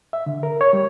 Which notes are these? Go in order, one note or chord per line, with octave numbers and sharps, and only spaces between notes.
E5
D3
A#4
C#5
G3